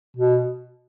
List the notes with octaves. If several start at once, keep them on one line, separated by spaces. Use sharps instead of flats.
B2